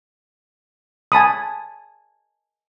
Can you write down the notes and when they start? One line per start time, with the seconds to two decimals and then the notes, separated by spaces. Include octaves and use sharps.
1.12 G#5 A5 B5 D#6